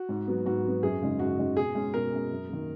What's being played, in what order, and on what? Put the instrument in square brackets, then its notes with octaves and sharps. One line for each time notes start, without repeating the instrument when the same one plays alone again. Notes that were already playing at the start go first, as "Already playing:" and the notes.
Already playing: [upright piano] F#4
[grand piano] G#2
F#3 B3
[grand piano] G#2 [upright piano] F#4
[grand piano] F#3 B3
[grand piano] F#2 [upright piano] G#4
[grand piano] C#3 G#3 D#4
[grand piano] F#2 [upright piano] F#4
[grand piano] C#3 G#3 D#4
[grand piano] B2 [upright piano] G#4
[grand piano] G#3 C#4
[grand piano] B2 [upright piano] A#4
[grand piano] G#3 C#4
F#2
D#3 A#3